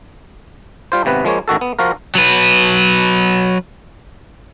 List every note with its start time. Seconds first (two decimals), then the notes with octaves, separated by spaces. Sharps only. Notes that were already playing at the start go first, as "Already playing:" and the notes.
0.92 G3 F4 C5
1.05 G#1 C3 B3 B4
1.25 F3 G#3 A#3 C#5
1.48 A1 D#3 F#4 A4
1.61 B3
1.79 F3 F4 F#4 A#4
2.15 F#3 B4